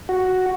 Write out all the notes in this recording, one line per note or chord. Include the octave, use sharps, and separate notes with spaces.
F#4